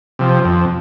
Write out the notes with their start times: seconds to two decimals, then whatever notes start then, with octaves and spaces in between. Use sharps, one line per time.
0.19 C3 F3
0.45 F2